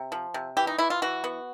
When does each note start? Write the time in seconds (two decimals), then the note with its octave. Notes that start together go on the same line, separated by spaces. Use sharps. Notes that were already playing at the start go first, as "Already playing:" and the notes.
Already playing: C3
0.12 F3
0.34 C3
0.57 E3 G4
0.67 D#4
0.78 E3 E4
0.90 F4
1.02 E3 F#4
1.24 B3